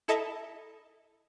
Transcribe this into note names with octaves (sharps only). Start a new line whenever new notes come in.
E4 A4 D#5 E5 A5 A#5